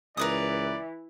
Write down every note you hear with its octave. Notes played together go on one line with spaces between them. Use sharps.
C#2 E3 A#4 B4 D5 D#6